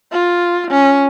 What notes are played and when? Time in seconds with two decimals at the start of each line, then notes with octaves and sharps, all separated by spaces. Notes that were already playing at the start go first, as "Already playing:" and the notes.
0.12 F4
0.71 C#4